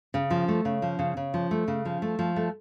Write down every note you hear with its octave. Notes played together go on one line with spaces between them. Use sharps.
C#3
F3
A3
C#3
F3
C#3
C#3
F3
A3
C#3
F3
A3
F3
A3